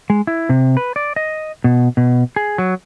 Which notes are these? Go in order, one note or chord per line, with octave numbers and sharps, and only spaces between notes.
G#3
E4
C3
B4
D5
D#5
B2
B2
G#4
F#3